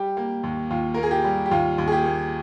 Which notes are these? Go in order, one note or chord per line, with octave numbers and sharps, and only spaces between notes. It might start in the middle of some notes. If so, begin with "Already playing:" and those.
Already playing: G3 G4
A#3
D#2
D#2 F4
A#3 A#4
G#4
G4
G3
G4
D#2 F4
D#2
G#4
G4
A#3